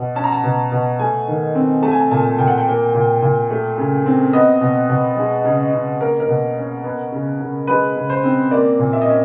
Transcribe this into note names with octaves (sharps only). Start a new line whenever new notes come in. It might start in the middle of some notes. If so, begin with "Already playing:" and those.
Already playing: B2
C#4 A5
A#5
A5
B2
B2
A3 G#5
D#3
C4
A3 A5
G#5
A5
A#2 A5
A#2 G5
F#5
G5
A#3
A#2
A#2
A3
C#3
C4
B3 D#5
B2
B2
G#3
C#3
C#3
A#3 A#4
A#4
B2
C#4
B3
C#3
C#3
G#3 B4
C#3
C5
C4
A#3 D5
A#2
E5
D#5
C#4